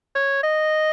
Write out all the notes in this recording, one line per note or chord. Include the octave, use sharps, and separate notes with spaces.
C#5
D#5